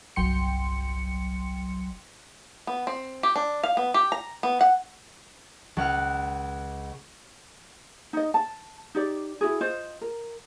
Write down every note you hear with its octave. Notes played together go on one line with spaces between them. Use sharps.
G1 C2 F#3 G5 C6 C#7
B3
C4
G4
D4
F5
B3
G4
A#5
B3
F#5
C#2 F#5 F6
D#4 D#5
A5
D#4 G4 D5
E4 F#4 G#4
F4 C5 D#5
A#4